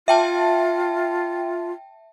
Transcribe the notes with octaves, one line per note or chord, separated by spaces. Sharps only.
F4 E5 G5 A5